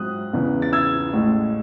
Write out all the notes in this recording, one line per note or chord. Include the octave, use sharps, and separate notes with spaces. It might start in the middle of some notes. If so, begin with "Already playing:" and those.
Already playing: G#2 F#3 C4 D#6 F#6
E2 C#3 E3
A6
E6 G#6
A1 A2 G#3